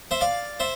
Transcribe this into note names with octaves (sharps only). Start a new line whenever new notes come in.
C5 E5
D5 F5
C5 E5